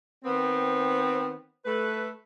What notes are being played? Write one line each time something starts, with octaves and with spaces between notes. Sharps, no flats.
D#3 B3 C4
A3 B4